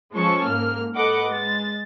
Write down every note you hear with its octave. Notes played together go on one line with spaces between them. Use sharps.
F3 G#3 C#4 A4 C#6
G#2 A#3 F6
A4 B4 D#5 F#5 D6
G#3 A6